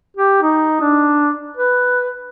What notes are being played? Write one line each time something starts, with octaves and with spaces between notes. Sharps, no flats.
G4
D#4
D4
B4